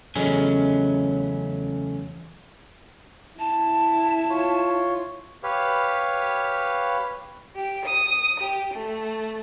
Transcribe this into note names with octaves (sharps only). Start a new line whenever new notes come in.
E2 C#3 F#3 A3 C#4 D#5
E4 A5
F4 C#5
G4 B4 C#5 F5
G4
D#6
G4
A3